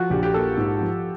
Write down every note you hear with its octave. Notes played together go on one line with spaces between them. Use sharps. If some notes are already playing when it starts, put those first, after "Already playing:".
Already playing: F3 F4 F#4
A#1 G4
G4
A#3 A4
G#2
F3